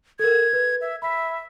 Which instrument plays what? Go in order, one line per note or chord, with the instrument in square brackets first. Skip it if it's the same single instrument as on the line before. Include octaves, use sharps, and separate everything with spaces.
[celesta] A4 A#4 [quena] G#6
[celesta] B4
[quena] E5
[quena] E5 [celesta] B5 B6